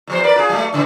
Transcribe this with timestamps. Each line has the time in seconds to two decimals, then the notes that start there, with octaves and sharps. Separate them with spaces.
0.07 E2 F3 C5
0.24 A#4 B4 D5
0.36 F4 G#4
0.49 F#3 A3
0.73 A2 C#3 E3